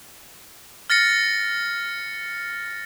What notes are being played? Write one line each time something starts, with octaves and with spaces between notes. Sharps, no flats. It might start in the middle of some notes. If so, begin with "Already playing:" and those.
F6 A6 A#6 C#7